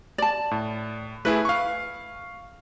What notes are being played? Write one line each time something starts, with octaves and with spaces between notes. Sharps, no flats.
D5 A5
A2
A3 E4 G#4 B4
F5 C#6